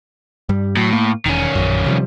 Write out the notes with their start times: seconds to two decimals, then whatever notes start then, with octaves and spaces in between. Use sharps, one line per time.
0.49 G2 G3
0.77 A2 F#3
0.93 A#3
1.26 E1 D#3 C#4
1.55 A#1 F#2
1.86 C3 F3 G3